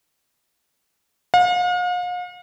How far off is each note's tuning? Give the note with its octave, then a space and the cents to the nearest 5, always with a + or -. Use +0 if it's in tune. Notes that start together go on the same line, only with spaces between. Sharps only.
F5 +45